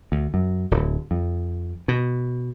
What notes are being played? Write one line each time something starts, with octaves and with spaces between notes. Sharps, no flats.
D2
F#2
D1
F2
B2